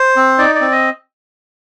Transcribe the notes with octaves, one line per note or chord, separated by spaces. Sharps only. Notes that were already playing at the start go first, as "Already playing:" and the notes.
Already playing: C5
C4
D#4 D5
D5
C4
D#5